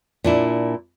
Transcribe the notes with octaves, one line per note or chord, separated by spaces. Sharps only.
A#2 D4 E4